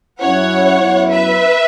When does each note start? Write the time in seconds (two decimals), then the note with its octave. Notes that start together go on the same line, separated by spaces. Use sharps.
0.21 F#2 F#3 C#4 E4 C#5 F#5
0.81 F#2 F#3 B3 E4
1.11 B4 E5